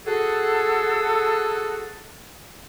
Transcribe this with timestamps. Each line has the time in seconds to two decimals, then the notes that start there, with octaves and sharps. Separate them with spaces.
0.06 F#4 G#4 A4